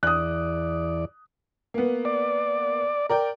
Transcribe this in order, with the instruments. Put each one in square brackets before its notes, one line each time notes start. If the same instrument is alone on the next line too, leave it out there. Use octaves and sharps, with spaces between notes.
[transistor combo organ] E2 D5 [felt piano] D#6 F#6
[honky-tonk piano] A#3 B3
[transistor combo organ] D5
[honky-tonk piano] A#4 D5 G5